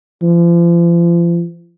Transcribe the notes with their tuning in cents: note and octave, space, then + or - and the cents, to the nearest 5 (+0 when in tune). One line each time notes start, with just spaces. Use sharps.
F3 -35